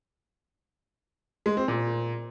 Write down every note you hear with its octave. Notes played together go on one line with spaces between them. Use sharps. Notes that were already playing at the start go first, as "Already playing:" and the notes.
G#3
C4
A#2